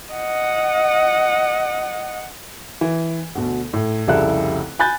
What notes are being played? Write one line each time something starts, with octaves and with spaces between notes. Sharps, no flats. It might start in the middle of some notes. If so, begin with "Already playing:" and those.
D#5 F#5
E3
D2 B2
A2
F1 C2 C#3 E4 A4 F#6
G#5 B5 F#6 G6 A6